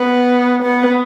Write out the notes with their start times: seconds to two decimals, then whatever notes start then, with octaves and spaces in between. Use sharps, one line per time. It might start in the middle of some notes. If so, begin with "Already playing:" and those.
Already playing: B3
0.63 B3